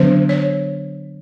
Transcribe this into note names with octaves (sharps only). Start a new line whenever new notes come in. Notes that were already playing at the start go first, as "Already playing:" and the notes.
Already playing: D3 F#3 B3 D4 C5
C#5